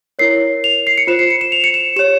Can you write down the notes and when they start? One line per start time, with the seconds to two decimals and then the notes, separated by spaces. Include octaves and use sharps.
0.19 E4 A#4 C#5 C7
0.64 F7
0.87 C7
0.98 C#7
1.07 F4 C5 E7
1.19 C7
1.30 C#7
1.41 E7
1.52 F7
1.64 C#7
1.74 E7
1.96 G4 C#5 E7